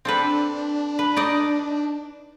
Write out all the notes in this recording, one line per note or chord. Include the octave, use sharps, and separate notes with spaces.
C4 D4 A4 B4
B4
D#4 D5 D#5